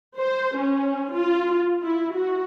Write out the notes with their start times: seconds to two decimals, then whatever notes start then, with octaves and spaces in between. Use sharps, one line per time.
0.18 C5
0.58 C#4
1.13 F4
1.83 E4
2.15 F#4